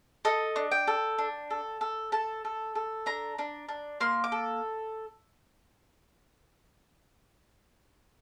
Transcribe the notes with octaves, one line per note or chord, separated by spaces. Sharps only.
A4 D#5
D4
G5
A4
D4
A4
A4
A4 A5
A4
A4
D4 A#5
D4
D4
A#3 C6
D6
A4